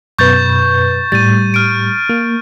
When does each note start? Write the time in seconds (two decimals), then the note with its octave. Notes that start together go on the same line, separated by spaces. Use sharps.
0.19 F#2 B2 B4 C#6 G6 A6
1.12 A2 G3 A6 D#7
1.54 F6 D7
2.09 A#3